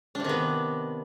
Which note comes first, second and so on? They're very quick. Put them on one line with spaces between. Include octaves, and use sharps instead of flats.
D4 C3 D#3 B3